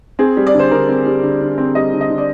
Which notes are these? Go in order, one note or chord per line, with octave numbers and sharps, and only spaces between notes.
C4 G#4
G3
D5
D3
C5
D3 A#4
C4
G3
D3
D3
C4
G3 D#5
D3
D#5
D3
D5